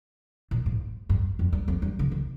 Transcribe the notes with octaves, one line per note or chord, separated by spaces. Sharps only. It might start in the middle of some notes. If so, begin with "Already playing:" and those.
A#2
G#2
G2
F2
G2
F2
G2
C#3
D#3